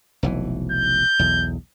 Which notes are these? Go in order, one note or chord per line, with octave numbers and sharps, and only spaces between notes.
F1 B1 E3
G6
B1 E2